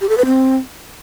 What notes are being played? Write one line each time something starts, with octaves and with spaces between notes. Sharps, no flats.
G4
A4
B4
C4